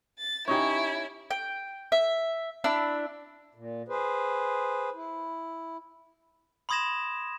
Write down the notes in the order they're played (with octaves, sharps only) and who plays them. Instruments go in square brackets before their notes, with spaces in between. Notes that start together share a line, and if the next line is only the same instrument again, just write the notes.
[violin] A6
[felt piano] C#4 D#4 G4 [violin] E4 [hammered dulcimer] C#5 G#5
[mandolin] G5
E5
D4 E4 E6
[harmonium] A#2
G#4 B4 C5
E4
[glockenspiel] B5 C6 D#6 G#6 A#6 E7